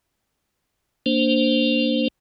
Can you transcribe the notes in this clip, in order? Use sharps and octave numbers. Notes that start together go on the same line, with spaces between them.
A#3 D4 C5